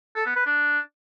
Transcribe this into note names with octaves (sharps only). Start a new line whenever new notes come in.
A4
B3
B4
D4